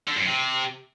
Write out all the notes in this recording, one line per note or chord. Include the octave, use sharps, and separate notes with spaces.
D3
F#2
C3